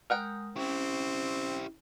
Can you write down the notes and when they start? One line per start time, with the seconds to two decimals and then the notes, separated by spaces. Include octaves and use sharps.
0.10 G#3 A#4 F#5 G5 D#6
0.56 C4 C#4 E4 G4